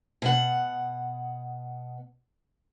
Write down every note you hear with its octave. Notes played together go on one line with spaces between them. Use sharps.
B2 F#5